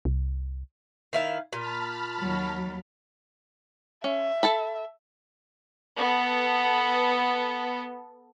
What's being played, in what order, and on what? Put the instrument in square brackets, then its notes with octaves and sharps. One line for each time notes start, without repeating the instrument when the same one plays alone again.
[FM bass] C2
[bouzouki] D#3 E4 F5
[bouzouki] A#2 [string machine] A5 B5 F6
[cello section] D#2 F#3
[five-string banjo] C#4 [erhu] E5
[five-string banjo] A4 A5 B5
[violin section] B3 A4